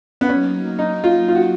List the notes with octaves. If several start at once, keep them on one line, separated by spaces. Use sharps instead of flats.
B3
F#3 A#3 C#4 D#4
D#4
F4
F4
F#4